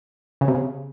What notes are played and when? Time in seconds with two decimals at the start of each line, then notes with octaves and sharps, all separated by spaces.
0.41 C#3
0.48 C3
0.55 C#3